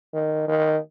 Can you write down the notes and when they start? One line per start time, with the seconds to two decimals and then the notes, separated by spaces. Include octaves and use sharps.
0.14 D#3
0.48 D#3